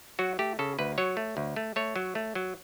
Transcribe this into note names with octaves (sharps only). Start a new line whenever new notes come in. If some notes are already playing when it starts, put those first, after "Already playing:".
F#3 F#4
A3 G4
C#3 A4
D2 B4
F#3 C#5
A3
D2
A3
A3 C#5
F#3
A3
F#3